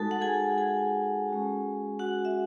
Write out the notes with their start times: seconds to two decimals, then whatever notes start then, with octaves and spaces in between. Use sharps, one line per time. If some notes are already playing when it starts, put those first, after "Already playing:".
Already playing: G#3 D#4 F#4 A4 A5
0.11 F#5
0.21 G#4 G#5
0.58 G#4 G#5
1.28 G#3 C#4 F#4
1.99 F#4 F#5
2.25 E5